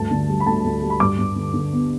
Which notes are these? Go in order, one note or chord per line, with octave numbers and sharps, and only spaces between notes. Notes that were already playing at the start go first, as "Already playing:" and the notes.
Already playing: D2 G2 A5
D3
G3
B5
D2 A5
D2
G3
B5
G2 D6
G2
D3
D3
B3